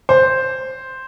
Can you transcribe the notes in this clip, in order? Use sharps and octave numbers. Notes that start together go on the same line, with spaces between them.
C5